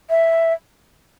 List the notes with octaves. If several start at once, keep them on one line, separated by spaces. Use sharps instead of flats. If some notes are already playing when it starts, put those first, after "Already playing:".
E5